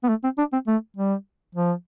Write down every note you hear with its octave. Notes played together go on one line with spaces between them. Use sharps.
B3
A3
C4
D4
C4
A3
G3
F3